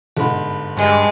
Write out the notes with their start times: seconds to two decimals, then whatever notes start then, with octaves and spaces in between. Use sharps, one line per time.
0.17 G1 G#2 B5
0.77 G2 G#3